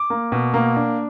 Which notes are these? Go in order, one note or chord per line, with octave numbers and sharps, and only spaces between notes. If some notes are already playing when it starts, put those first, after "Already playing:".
Already playing: D6
A#3
B2
A#3
D4